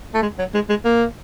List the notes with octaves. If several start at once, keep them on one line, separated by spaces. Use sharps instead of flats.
A3
G#3
F#3
G#3
G#3
A#3